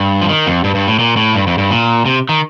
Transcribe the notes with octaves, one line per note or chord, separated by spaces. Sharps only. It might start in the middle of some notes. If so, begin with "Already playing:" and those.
Already playing: G2
F3
D#3
F2
G2
G2
A2
A#2
A2
G2
F2
G2
A#2
C3
D#3